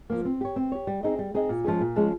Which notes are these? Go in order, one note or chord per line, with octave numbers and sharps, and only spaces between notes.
F3 A#3
C4
G4 C#5
C4
G4 C#5
G3
C4 D#4 G#4 D#5
G3
C4 D#4 G#4 D#5
A#2
F3 G#3 C#4 G#4
A#2
F3 G#3 C#4 G#4